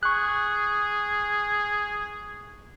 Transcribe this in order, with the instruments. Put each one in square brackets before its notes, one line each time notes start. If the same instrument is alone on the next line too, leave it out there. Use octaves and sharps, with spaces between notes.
[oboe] G#4 [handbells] C#6 F#6